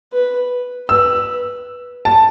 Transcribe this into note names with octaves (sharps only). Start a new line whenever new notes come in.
B4
B4 E6
A5